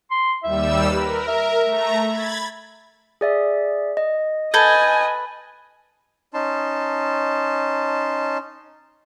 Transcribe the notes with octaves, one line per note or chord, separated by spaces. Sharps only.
C6
D#2 G3 E5 E6
A#4 B4
E5
A3 A#5
B5 G#6 A6
G#4 D5 E5
D#5
A4 B4 D#5 G#5 A5 G6 G#6
C#4 D#4 A5 C6